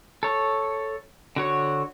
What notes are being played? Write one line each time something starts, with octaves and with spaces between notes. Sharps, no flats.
A4 C#5
D3 F#4 C#5